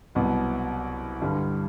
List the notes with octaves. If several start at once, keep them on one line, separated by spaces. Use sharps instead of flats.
C2 B2 F#3 B3
G2 D3 G3